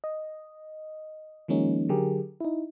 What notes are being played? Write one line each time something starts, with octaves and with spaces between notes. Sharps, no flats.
D#5
D#3 F3 G#3 A#3 C#4 D#4
D3 F#3 G4 G#4 A#4
D#4 E4